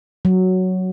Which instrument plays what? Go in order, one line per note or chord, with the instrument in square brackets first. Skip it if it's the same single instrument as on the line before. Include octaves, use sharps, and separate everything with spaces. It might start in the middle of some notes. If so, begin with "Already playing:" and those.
[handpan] F#3